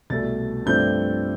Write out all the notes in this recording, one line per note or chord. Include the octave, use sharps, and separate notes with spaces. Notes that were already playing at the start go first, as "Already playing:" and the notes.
C2 B2 A3 A6
G2 F3 A3 C4 G6